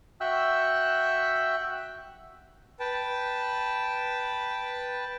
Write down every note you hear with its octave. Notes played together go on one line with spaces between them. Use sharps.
F#4 E5 G5 E6 F#6
B4 G5 A5